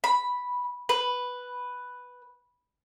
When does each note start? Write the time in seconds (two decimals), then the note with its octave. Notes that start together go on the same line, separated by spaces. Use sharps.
0.04 B5
0.89 B4